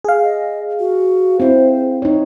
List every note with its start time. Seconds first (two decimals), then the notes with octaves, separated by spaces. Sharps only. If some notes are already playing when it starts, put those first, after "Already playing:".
0.04 G#4 F5
0.23 D#5
0.79 F#4
1.40 C4 E4 C5
2.02 D#4 C#5